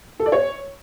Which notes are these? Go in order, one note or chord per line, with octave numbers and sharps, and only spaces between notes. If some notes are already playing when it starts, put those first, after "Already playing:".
A4
D5
C#5